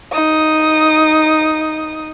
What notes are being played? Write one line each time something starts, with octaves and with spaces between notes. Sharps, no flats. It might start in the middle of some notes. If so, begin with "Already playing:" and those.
D#4 D#6